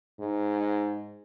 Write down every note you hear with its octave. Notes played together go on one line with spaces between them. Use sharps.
G#2